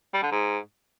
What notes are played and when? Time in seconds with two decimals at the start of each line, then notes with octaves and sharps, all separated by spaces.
0.14 G3
0.23 D3
0.31 G#2